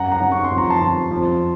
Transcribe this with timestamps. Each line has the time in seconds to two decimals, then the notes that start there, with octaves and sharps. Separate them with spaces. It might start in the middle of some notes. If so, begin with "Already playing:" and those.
Already playing: F#2 F#5 A#5
0.12 F#5 A#5
0.21 F#2
0.32 C#6
0.44 C6
0.51 F2
0.58 A#5
0.70 A5 C6
0.81 F2
1.11 F2